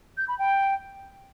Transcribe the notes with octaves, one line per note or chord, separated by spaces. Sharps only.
G6
B5
G5